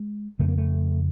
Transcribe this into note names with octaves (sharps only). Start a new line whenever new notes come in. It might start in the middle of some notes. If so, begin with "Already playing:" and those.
Already playing: G#3
F2 C#3 A3
A#3
A3